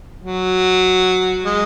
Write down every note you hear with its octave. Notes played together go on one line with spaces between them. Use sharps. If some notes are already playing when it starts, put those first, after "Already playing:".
F#3
G#3